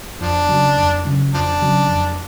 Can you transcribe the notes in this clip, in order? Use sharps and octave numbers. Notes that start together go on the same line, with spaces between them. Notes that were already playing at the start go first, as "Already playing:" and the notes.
F2 F3 D4
C#3 F#3
F2
C#3 F#3
F2 F3 D4
C#3 F#3
F2